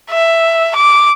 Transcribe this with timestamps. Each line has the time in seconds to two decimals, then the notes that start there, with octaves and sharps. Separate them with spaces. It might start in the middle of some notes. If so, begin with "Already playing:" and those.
0.10 E5
0.76 D6